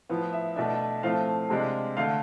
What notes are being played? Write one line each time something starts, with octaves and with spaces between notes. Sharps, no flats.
A2 F3 B3
E5
B2 A3 D4 E5
A2 F3 A3 C4 F5
C3 G#3 D4
D3 A3 F5